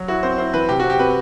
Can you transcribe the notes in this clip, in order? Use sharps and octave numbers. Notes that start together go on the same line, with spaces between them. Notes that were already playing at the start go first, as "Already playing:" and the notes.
Already playing: F#3
E4 F#4
C4 C5
E4 C5
E3 B4
C3 G4
F#4
C4
G4
C4 B4